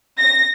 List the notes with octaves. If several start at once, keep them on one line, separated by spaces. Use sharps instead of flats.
A#6